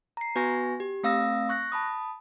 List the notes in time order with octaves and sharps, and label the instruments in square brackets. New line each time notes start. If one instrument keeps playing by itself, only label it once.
[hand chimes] A#5 C7
B3 F#4 B4 G#5 C#6 A#6
G4
A3 C4 F5 D#6 E6 A#6
C#6 F#6 A#6
A5 B5 D#6